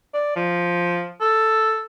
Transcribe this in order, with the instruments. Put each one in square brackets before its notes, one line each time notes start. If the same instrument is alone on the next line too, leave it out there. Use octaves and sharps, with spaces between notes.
[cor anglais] D5
F3
A4